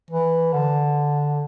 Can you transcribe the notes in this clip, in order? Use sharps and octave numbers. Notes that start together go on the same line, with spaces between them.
E3
D3